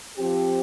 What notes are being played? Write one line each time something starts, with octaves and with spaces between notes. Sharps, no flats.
F3 C4 G4